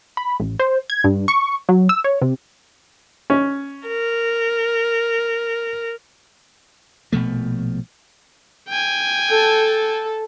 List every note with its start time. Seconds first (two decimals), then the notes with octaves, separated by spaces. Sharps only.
0.17 B5
0.40 A1
0.59 C5
0.90 G#6
1.04 G2
1.28 C#6
1.69 F#3
1.89 E6
2.04 C#5
2.22 C3
3.30 C#4
3.86 A#4
7.12 A#1 B2 F3 A3
8.69 G5 G#5
9.29 A4